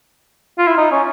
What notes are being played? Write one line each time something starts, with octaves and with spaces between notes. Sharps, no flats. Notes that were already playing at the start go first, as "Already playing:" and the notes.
F4
E4
D#4
C#4